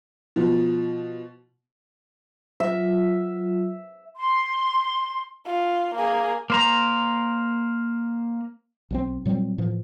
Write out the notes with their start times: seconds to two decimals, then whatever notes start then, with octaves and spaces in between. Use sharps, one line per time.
0.36 B2 F3
2.60 F#3 F4 E5
4.16 C6
5.46 F4
5.94 A#3 G#4
6.50 A#3 C5 A#5
8.91 B1 F#3 C4
9.25 A#2 F#3 G3 C4
9.58 A2 E3 F3